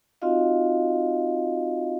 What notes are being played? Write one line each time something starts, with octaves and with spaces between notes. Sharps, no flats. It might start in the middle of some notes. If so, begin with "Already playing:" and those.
C4 D#4 F4 F#4 D#5 F5